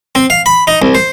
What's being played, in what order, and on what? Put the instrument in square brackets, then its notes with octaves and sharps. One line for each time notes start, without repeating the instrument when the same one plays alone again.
[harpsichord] C4
F5
B5
D#4
C2
C5